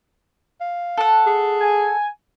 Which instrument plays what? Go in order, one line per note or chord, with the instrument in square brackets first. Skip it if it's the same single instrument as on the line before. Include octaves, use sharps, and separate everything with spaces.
[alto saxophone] F5
[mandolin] A4 F#5
[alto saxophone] G#4
[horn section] G#5